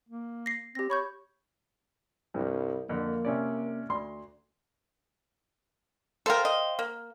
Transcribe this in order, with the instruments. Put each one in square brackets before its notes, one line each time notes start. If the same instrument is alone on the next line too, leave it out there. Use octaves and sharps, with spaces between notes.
[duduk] A#3
[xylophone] A#6 C7
[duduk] C4 [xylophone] G4 A#6
[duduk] C#5 [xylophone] B5 C#6 G6
[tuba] C2 [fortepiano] G2
[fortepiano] F2 D3 [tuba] A#3
[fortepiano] C3 C#4 D5
D2 C6
[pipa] A4 A#4 [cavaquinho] C5 F5 G5
[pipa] D#5
A#3